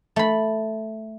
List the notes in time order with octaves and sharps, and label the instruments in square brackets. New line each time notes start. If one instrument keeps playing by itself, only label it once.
[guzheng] A3 B5